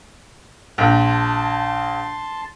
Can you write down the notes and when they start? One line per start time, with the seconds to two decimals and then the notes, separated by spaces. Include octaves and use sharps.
0.78 A#1 A5 C6